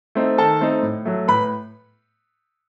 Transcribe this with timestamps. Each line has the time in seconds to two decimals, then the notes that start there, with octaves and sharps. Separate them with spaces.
0.15 A3 C4 D#4
0.38 D#3 A4 A5
0.61 A3 C4 D#4
0.83 A2
1.05 F#3 A3
1.28 A2 B4 B5